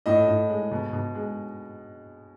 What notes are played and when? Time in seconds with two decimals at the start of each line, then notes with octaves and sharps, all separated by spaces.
0.06 A2 D#5
0.28 A2
0.49 G#3
0.71 B2
0.93 B2
1.15 G#3